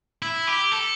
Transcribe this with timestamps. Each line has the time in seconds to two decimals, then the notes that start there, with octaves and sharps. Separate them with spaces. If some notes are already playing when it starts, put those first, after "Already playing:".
0.22 E4
0.47 G4
0.72 A4